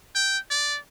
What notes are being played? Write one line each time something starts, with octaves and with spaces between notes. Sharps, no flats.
G5
D5